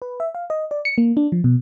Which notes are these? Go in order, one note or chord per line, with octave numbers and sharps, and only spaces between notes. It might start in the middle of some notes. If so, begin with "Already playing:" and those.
B4
E5
F5
D#5
D5
C#7
A#3
D4
F3
B2